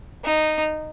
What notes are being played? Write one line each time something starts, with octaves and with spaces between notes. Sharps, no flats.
D#4